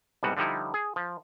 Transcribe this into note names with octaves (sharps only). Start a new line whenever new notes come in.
C2 G#2 B2 G3 F#4
D3 F3 G3 D#4 E4
G#4
F3